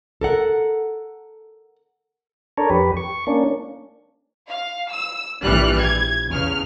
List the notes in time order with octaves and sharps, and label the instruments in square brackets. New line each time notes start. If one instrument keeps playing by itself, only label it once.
[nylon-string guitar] A4 A#4 F#5
[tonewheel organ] D4 A4 A#4 C#5
F2 G4 B4
C#6
A#3 C#4 D4
[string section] F5
E6
A#1 E3 G3 F6 F#6
G#6
E2 C#3 F6